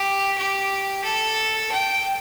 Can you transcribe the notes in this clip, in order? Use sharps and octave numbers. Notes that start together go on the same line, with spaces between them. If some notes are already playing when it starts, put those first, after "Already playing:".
Already playing: G4
G4
A4
G5